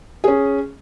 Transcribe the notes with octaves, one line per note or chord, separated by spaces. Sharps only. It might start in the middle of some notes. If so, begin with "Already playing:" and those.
C#4 G#4